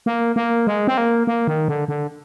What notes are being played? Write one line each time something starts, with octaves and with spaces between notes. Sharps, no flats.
A#3
A#3
G#3
C4
A#3
A#3
D#3
D3
D3